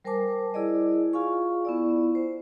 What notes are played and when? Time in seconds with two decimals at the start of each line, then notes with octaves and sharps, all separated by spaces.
0.04 G3 A#4 C5 G#5 A5 D6
0.54 E4 G#4 D5 D#5
1.13 F4 G#4 F5 G#5 C#6
1.65 B3 E4 D5
2.15 C5